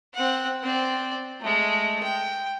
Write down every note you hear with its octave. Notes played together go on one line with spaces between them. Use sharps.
C4 F#5
C4 D5
G#3 A3
G5